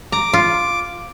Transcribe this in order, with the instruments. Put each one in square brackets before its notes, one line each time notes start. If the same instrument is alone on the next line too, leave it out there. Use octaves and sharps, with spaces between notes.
[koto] A#5 [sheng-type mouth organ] D6
[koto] F4